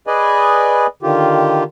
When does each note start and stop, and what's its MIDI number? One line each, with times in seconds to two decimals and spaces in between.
0.07 0.87 68
0.07 0.87 71
0.07 0.87 74
0.07 0.87 75
0.07 0.87 80
1.03 1.64 50
1.03 1.64 51
1.03 1.64 65
1.03 1.64 67